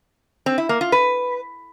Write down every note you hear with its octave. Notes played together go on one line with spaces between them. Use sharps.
C4
E4
A#3
F4
B4